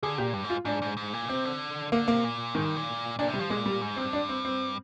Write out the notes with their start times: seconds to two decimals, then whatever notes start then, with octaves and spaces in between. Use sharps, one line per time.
0.03 D3 G#4
0.18 A#2 G4
0.34 G2
0.44 G#2
0.50 F4
0.65 G#2 D4
0.82 G#2
0.97 G#2
1.13 A#2
1.29 C3 C4
1.45 D3
1.92 D3 A#3
2.08 C3 A#3
2.24 A#2
2.55 G#2 D#3
2.65 G2
2.76 A#2
3.19 A#2 D4
3.28 C3
3.34 G3
3.39 F3
3.50 A#2 G#3
3.66 G3
3.81 G#2
3.97 G2 C4
4.13 D4
4.29 C4
4.45 C4